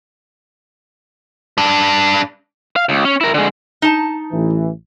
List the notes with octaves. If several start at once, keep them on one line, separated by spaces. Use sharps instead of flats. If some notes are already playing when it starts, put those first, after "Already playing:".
G2 D4
F5
C#2
C#4
E4 A#4
D3 G#3
D#4 A5
A1 E3